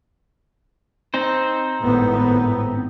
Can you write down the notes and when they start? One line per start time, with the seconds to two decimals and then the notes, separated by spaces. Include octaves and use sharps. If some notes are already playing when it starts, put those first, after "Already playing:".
1.14 C4 D#4 C5
1.81 G#1 A2 B3